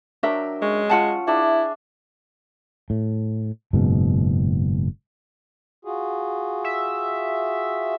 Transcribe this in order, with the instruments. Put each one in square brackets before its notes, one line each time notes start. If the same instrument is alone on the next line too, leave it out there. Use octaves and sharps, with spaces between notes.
[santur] F#3 G5 E6 [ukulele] D4 A#4 E5
[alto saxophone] G#3 [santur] C#4
[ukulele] F4 F#5 A5
[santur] D4 G#4 E5 [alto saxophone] E4
[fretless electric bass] A2
F#1 G#2 B2
[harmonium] F4 F#4 G#4
[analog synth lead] E5